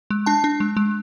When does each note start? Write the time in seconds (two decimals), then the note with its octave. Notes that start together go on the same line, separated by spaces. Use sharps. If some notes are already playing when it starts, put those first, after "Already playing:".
0.10 G#3
0.26 D4 A5
0.44 D4
0.60 G#3
0.77 G#3